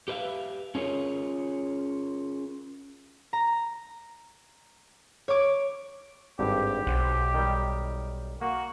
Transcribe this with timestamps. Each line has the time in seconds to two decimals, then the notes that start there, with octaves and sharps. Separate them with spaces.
0.08 G4 B4 E5 F5
0.75 C#4 F4 G#4 A#4 C#5
3.33 A#5
5.28 C#5 D6
6.39 G#1 G2 G4
6.87 B1 C5 F#5
7.34 D#3 G3
8.41 A#3 F#4